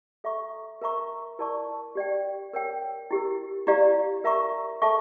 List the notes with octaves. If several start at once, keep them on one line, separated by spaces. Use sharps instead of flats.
A4 E5 A#5 C#6
A#4 E5 A#5 C#6
E4 A#4 D5 A5 C#6
G4 D5 G5
A#4 C#5 G5
E4 G4 A#4
E4 G4 D5 F5 A#5
A#4 E5 A#5 C#6
A4 E5 A5 C#6